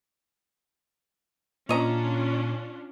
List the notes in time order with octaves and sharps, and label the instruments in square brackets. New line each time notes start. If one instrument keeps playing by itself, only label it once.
[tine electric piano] A#2 [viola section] C#4 D4 F4 [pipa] C#5 D#5 A#5